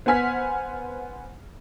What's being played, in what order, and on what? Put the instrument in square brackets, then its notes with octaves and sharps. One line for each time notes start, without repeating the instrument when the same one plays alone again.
[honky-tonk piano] B3 C5 F#5 G#5 F6 B6